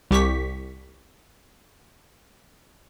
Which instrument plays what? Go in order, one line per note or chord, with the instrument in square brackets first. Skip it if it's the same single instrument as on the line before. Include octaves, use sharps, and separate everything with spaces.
[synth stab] C2 G4 C#6 B6